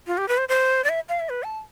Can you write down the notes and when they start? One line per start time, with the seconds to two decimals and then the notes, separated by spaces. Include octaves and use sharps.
0.07 F4
0.18 G4
0.29 B4
0.38 C5
0.49 C5
0.84 D5
0.89 E5
1.09 F5
1.20 E5
1.29 B4
1.43 A5